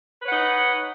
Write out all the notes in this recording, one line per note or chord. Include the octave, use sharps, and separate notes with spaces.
D#4 B4 C#5 F#5